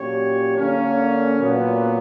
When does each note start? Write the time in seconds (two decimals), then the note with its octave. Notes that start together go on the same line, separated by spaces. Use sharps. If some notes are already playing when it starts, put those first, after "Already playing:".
Already playing: A#2 F#3 C#4 G4 C#5
0.56 D3 A#3 C#4
1.37 A#2 F#3 B3